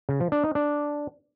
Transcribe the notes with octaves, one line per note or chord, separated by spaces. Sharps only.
C#3
F3
D4
D#4
D4